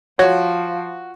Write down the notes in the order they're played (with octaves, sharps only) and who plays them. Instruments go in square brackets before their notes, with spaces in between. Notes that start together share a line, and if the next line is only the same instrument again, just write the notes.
[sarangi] F3 [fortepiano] F#4 [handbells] C#5